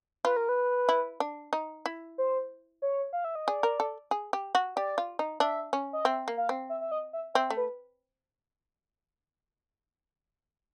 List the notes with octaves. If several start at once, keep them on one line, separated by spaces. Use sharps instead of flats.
F4 B4
A#4
B4
E4
D4
D#4
E4
C5
C#5
F5
E5
D#5
G#4 D5
A#4
A4
G#4
G4
F#4
G4 D5
F4
D#4
D4 E5
C#4
D#5
C4 E5
A#3
F5
C4
E5
E5
D#5
E5
C4 E5
A3
B4